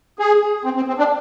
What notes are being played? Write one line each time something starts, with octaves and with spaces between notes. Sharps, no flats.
G#4
C4
C4
C4
D4